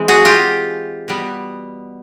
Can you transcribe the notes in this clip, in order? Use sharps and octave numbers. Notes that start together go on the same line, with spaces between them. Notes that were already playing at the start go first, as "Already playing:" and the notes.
Already playing: E3 G#3 C4
F#4 G#4
F4 G4
B2 G3 B3